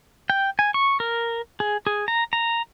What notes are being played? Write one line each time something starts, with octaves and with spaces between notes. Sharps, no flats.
G5
G#5
C#6
A#4
G#4
G#4
A#5
A#5